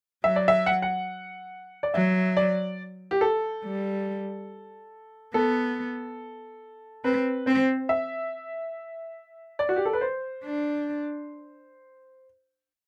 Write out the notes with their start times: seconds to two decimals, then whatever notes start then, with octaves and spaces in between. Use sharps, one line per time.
0.24 F#3 E5
0.36 D5
0.48 E5
0.66 F#5
0.82 F#5
1.83 D5
1.94 F#3 E5
2.37 D5
3.11 G4
3.21 A4
3.64 G3
5.34 B3 A4
7.04 C4 B4
7.46 C4 C5
7.89 E5
9.59 D5
9.69 F#4
9.76 G4
9.85 A4
9.93 B4
10.01 C5
10.44 D4